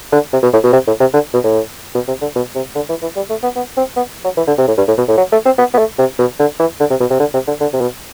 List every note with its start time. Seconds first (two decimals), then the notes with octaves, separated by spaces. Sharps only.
0.12 D3
0.33 C3
0.43 B2
0.53 A2
0.63 B2
0.73 C3
0.87 A2
1.00 C3
1.14 D3
1.34 B2
1.44 A2
1.95 B2
2.08 C3
2.21 D3
2.35 B2
2.55 C3
2.75 D3
2.89 E3
3.02 E3
3.16 G3
3.30 A3
3.43 B3
3.56 B3
3.77 C4
3.97 B3
4.24 F#3
4.37 E3
4.47 D3
4.58 C3
4.68 A2
4.77 G2
4.88 A2
4.98 B2
5.08 A2
5.17 F#3
5.32 A3
5.45 C4
5.58 B3
5.74 B3
5.78 A3
5.99 C3
6.19 B2
6.39 D3
6.59 E3
6.80 D3
6.90 C3
7.00 B2
7.10 C3
7.20 D3
7.34 C3
7.47 D3
7.61 D3
7.73 C3
7.81 B2